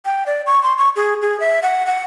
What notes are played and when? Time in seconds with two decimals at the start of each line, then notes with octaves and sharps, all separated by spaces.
0.05 G5
0.26 D5
0.46 C#6
0.63 C6
0.78 C#6
0.96 G#4
1.22 G#4
1.40 E5
1.63 F#5
1.86 F#5